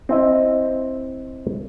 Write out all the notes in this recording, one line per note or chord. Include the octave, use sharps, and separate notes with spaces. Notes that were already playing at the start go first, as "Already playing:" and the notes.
C4 E4 D#5